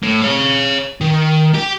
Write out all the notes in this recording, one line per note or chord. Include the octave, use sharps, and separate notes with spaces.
A2
C#5 F5
D#3
G4 G5